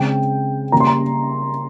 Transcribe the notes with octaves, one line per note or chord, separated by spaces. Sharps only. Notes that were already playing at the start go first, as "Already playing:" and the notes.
Already playing: C#3 G#3 C4 G5
C#3 G3 A#3 A#5
C6
A#5